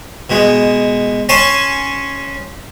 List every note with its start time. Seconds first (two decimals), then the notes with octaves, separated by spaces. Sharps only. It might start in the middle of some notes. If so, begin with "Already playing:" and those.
0.30 B2 G#3
1.29 C#4 G#5 A5 C6 C#6